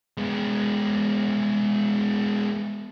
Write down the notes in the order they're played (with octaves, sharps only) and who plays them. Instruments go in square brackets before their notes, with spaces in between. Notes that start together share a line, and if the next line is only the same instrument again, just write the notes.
[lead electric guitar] G#3 B3